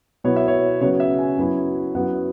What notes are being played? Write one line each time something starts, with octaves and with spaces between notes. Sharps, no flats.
B2 F#3 B3 E4 C#5
E5
C#5
C#3 F#3 B3 C#5
E5
G#5
F#2 F#3 B3 E4
F#2 F#3 B3 E4 F#5